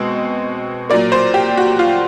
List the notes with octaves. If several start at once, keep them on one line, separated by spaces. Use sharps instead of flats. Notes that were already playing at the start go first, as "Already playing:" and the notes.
Already playing: B2 G#3 C4
A#2 F#3 A#3 D5
C5
G4
F#4
F4